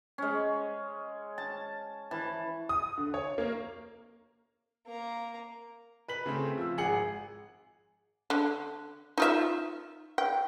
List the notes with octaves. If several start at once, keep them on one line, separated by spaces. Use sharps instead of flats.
G#3 C#4
A5
E3 A5
D#6
D3
C#5
A#3
A#3 A#5
B4 B6 F#7
C#3 A3 C4
F3 E6
G#1 G#4 F#5 C#7 F#7
D3
D#4 F4 E5
G5